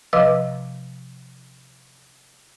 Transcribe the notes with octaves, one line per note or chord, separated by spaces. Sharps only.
C3 F3 B4 D#5 D6 E6